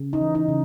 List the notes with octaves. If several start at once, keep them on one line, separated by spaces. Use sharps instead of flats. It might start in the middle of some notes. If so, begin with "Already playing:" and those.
Already playing: C#3
D#4
E3
D#4
C#3